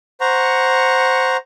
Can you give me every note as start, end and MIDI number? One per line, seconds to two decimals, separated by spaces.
0.21 1.37 72
0.21 1.37 78
0.21 1.37 82
0.21 1.37 85